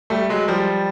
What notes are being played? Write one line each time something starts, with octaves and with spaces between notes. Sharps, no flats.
G3 A3
F#3 G#3
F3 G3